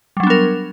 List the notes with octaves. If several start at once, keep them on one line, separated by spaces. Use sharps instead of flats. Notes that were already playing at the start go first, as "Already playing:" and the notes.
F#3 G3 B3 D4 A#4